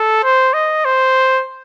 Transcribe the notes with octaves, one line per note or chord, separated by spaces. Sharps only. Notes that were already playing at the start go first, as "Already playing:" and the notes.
Already playing: A4
C5
D#5
C5